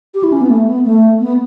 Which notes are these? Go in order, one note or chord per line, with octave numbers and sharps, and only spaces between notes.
G4
E4
C#4
B3
A3
B3
A3
B3